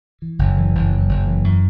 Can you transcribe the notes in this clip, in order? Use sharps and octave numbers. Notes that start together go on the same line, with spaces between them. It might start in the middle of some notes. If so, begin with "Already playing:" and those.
E3
F#1
E3
F#1
F#2
F#1
E3
F#2